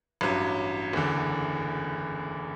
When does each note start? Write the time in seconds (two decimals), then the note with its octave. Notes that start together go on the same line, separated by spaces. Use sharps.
0.21 A1 G2 F#3
0.93 F#1 E2 D3